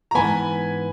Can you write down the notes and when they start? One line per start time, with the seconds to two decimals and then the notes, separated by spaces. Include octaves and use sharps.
0.11 A#5
0.15 G#2 E3 B3 G#5 B5